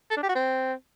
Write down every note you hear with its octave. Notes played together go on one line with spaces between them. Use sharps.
A4
D4
G4
F#4
C4